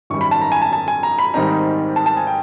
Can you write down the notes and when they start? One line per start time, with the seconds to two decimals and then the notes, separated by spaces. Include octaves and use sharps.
0.10 G#1 F#2 D#3 G3 C#6
0.21 B5
0.31 A5
0.41 A#5
0.52 G#5
0.62 A5
0.73 A5
0.88 G#5
1.03 A#5
1.19 B5
1.34 G#2 D#3 G3 C4 D#4 A#5
1.96 A5
2.06 A5
2.17 G#5
2.27 G5